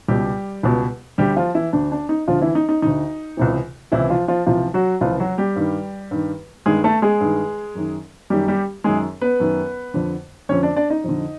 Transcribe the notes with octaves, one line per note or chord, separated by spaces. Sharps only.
C#2 B2 G3 G4
C#2 B2
D2 D3 G3 G4
F3 F4
E3 E4
D2 D3 D4
D4
D#4
D2 D3 F3 F4
E3 E4
D#4
D#4
D2 D3 D#4
C#2 C3 E3
C#2 C3 E3 E4
F3 F4
F3 F4
C#2 C3 E3 F3 F4
F#3 F#4
C#2 C3 E3 F3 F4
F#3 F#4
G3 G4
G2 D#3
G2 D#3
G2 D#3 G#3 G#4
A3 A4
G#3 G#4
G2 D#3
F#2 D#3
F#2 D#3 G3 G4
G3 G4
F#2 D#3 G#3 G#4
B3 B4
F#2 D#3
F2 D3
F2 D3 C#4 C#5
D4 D5
D4 D5
D#4 D#5
F2 D3